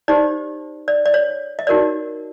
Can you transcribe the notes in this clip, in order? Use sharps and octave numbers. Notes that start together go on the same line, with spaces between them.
D#4 G4 C5 D5
D5
D5
C#5
D#5
D#4 F#4 A#4 C#5 D5